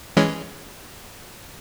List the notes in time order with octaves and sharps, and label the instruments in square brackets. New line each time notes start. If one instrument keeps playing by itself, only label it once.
[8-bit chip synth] E3 G#3 C#4